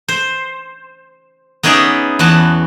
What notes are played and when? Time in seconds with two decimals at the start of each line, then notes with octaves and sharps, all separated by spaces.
0.08 C5
1.63 B3 C#4 D#4 G#4 D5 E5
2.19 E2 B3 F#4 A5